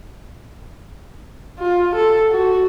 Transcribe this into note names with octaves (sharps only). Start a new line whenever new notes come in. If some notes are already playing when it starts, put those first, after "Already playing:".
F4
A4
F#4